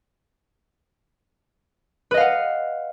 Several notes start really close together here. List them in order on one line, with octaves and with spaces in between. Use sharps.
B4 D#5 F5 F#5